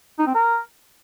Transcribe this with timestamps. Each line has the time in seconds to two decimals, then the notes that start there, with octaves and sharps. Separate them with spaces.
0.19 D#4
0.27 C4
0.34 A#4